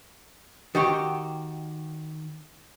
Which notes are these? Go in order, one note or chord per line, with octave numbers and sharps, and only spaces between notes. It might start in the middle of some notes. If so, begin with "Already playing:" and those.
D#3 F#4 G4